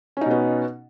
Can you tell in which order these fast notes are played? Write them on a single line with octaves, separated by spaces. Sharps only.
C#4 D#4 B2 B3